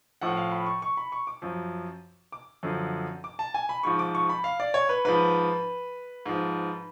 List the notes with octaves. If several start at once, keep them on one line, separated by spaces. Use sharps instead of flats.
A2 F3 F#5
F5
B5
C#6
C#6
B5
C#6
D6
F#2 F3
D6
F#2 D3 F3
D6
A5
G#5
B5
G#2 F3 C#6
D6
C#6
B5
F5
D5
C#5
B4
G#2 F3 B4
G#2 F3